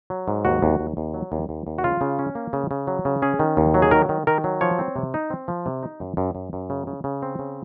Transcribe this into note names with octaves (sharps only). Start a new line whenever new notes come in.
F#3
G#2
D#2 F#4
D#2
D#2
D#2
F#3
D#2
D#2
D#2
F#4
C#3 F4
C#3
C#4
A#3
C#3
C#3
F#3
C#3
C#4 G#4
D#3
D#2
F#3
G#4
D#3 A#4
D#3
D#3 A#4
F#3
F3 C#5
C4
C3
D#4
C4
F3
C3
D#4
F#2
F#2
F#2
F#2
C#3
C#3
C#3
C4
C#3